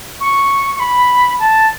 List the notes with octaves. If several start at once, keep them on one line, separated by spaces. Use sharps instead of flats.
C#6
C#6
B5
A5